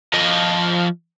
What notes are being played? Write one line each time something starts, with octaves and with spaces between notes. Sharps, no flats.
F3 D#5